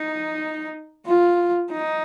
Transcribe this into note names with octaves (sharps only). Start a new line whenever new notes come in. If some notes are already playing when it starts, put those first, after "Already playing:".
Already playing: D#4
F4
D#4